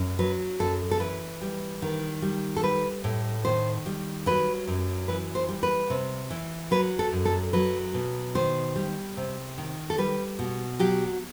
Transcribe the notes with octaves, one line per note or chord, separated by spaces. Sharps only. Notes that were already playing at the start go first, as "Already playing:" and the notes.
Already playing: F#2
F#3 B4
F#2 A4
A4
E3 B4
G3
D#3
G3
A4
G3 B4
A2
D#3 C5
G3
F#3 B4
F#2
E3 B4
C5
G3
B4
C3
E3
F#3 B4
A4
F#2
A4
F#3 B4
B2
D#3 C5
G3
C3
D#3
A4
G3 B4
B2
F#3 G4